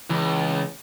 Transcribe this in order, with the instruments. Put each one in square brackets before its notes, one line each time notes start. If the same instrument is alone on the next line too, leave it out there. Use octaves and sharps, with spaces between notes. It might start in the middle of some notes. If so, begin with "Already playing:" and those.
[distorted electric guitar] C#2 [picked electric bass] E3